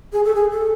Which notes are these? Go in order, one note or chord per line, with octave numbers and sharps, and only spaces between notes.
G#4
A4
G#4
A4